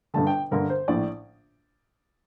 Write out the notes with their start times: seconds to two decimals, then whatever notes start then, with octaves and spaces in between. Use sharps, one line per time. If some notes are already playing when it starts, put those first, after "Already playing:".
0.14 G1 G2 D3 A5
0.27 G5
0.51 G1 G2 D3 A#4
0.70 C5
0.88 A#1 A2 D5